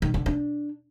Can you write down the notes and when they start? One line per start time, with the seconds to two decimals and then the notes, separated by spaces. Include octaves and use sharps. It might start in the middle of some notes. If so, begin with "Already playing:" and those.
0.02 D#3
0.14 D3
0.26 D4